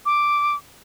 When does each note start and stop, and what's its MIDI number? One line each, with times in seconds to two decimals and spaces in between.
0.06 0.55 86